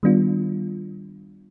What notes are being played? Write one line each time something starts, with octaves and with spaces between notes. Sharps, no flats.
D#3 G3 B3 D4 F4